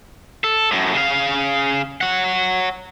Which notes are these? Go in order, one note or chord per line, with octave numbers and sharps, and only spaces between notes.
A4
F#2 A2
C#3 F5
C#5 F#5